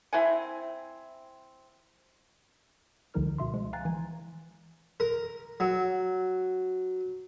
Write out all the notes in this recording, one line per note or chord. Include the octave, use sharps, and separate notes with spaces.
C4 E4 F#5 G#5
C#2 D3 F3 D#4 A#4 F6
B2 E5 C6
F3 G#3
F5 G5 G#5 A#5 F#6 A6
E3 G#5
A#4
F#3